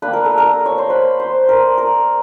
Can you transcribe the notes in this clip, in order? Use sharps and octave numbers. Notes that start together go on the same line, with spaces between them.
G3 A#3 D4 B4
A#4
A4
A#4
C#5
C5
B4
C5
A#4
A#4